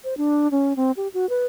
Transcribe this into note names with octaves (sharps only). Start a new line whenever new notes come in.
C5
D4
C#4
C4
G4
F#4
B4